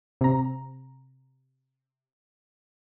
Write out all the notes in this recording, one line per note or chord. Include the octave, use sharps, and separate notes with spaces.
C3 A#5